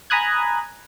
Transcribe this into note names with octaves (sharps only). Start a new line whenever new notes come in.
G#5 A#5 B5 D#6 F#6 G#6